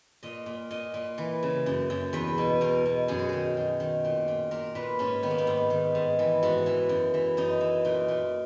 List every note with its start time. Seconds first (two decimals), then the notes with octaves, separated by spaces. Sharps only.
0.23 A#2 D#5
0.46 A#2
0.71 A#2 D#5
0.94 A#2
1.18 E3
1.43 C#3
1.66 F#2
1.90 F#2
2.13 E2 B4
2.38 B2
2.61 E2 A#4
2.86 B2
3.08 F#2 G#4
3.19 F#4
3.29 D#3 G#4
3.57 F#2
3.80 D#3
4.05 A#2
4.28 A#2
4.51 A#2 A#4
4.75 A#2 B4
4.99 G#2 C#4
5.23 D#3 B3
5.31 A#3
5.38 B3
5.47 G#2
5.70 D#3
5.95 G#2
6.19 E3
6.43 G#2 F#4
6.66 E3
6.89 F#2
7.14 E3
7.37 F#2 D#4
7.61 E3
7.85 A#2 D#4
8.08 A#2